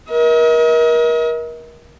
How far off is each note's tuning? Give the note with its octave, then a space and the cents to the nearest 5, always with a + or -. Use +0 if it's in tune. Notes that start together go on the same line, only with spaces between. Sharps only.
A#4 +35 D#5 +45